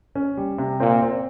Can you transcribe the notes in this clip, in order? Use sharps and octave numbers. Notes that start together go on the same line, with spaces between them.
C#4
G3
C3
A#2 C4
C4